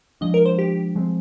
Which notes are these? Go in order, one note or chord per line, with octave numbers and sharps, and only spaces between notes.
F3 G#3 D4 D#5
A#4
C5
G4
F3 G#3 C4